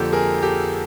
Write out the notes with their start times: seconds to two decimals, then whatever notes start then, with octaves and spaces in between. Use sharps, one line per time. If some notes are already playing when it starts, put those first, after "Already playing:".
Already playing: F2 D3 F3 A#3 G4 A4
0.12 G#4 A#4
0.42 G4 A4